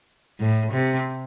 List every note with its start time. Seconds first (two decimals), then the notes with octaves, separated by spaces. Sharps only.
0.39 A2
0.72 C3